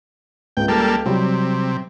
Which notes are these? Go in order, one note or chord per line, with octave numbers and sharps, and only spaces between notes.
C#2 G5
G3 A#3 A4
C3 F#3 G3